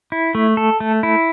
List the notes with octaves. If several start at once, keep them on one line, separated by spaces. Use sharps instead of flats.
E4
A3
A4
A3
E4